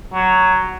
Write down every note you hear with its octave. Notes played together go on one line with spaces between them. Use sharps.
F#3